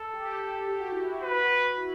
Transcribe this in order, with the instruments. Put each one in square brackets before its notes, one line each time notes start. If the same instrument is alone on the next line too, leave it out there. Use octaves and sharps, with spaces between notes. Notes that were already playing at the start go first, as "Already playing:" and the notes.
Already playing: [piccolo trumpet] A4
[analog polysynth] G4
G4
F#4
E4
F#4
[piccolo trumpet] B4
[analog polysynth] E4